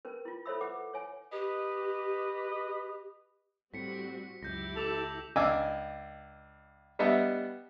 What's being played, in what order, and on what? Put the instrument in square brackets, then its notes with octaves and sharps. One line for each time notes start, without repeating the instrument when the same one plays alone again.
[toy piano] C#4 A#4 B4
E4 F4
A4 C5 C#5 E5 B5 E6
B4 F#5 D6
C#5 G#5
[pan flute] G4 [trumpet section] B4 D#5
[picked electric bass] A2 [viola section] G3 C4 F#4 [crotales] B6 C#7
[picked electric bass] C#2 F#2 [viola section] E4 G4 [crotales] G6 A#6
[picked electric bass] C#2 [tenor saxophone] A4 [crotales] D6 E6 F7
[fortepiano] C#2 D4 D#5 G#5 D6 E6
G3 B3 D4 D#5 E5